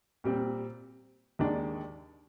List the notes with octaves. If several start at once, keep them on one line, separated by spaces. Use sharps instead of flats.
A#2 G3 C4
D#2 D#3 G#3 D4